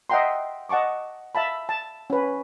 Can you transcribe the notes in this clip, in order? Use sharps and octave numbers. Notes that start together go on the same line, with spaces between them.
D#5 E5 F#5 G5 A#5 C6
D#5 F#5 A5 C#6 D6
E5 F5 A5 B5
A5
C#4 B4